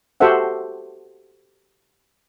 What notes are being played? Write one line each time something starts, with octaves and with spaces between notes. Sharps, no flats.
F#4 G4 A4 C5 E5 F#5